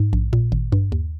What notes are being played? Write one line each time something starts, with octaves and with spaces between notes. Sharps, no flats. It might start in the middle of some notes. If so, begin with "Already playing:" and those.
Already playing: G#2
A#1
A#2
G#1
G2
D#2